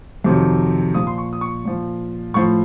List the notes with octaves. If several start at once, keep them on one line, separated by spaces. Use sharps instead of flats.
F2 C3 D#3 F#3
A#2 F3 D#6
C6
C#6
D#6
C#6
A#2 F3
A2 F3 C#6